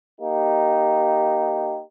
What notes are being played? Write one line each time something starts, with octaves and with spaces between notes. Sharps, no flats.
A#3 D#4 G4